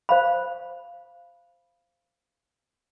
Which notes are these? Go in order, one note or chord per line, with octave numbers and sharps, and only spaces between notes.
C5 F5 B5